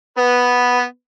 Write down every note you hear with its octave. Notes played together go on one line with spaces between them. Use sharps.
B3 B4